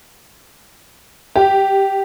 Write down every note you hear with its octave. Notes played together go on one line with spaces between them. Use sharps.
G4